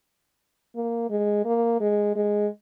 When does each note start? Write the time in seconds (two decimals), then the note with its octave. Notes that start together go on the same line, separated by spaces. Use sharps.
0.75 A#3
1.10 G#3
1.45 A#3
1.80 G#3
2.16 G#3